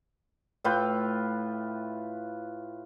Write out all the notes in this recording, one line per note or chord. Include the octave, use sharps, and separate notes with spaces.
A2 F4 B4 G5